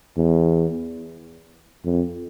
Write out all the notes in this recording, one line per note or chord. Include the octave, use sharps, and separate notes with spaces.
E2
F2